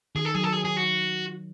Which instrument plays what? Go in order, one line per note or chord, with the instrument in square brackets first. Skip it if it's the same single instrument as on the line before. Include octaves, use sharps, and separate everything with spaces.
[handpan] D#3 [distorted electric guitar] G#4
[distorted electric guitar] A4
[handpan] F#3 [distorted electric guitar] G#4
[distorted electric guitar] A4
G#4
G#4
F#4